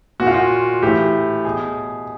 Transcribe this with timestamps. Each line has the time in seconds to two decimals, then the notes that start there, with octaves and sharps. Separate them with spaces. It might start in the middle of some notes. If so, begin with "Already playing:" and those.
0.20 A#2 F#4
0.27 F4
0.34 F#4
0.82 A2 E3 G4
1.45 B2 G#4